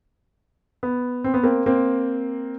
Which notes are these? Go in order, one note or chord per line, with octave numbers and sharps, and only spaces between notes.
B3
C4
B3
A#3 C4
A#3 C4